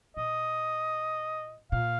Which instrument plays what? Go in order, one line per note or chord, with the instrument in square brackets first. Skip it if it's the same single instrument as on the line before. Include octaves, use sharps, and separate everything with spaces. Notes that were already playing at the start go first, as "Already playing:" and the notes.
[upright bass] A#2 [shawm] D#5
[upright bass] A#2 [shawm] F5